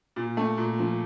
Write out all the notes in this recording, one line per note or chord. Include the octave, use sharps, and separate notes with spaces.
A#2
A3
A#2
F3